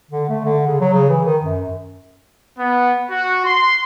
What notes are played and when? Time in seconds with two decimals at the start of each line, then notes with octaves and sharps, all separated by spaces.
0.11 D3
0.29 A3
0.44 D3
0.67 C#3
0.81 F#3
0.93 C#3
1.09 E3
1.25 D#3
1.42 F#2
2.58 B3
3.10 F#4
3.45 C6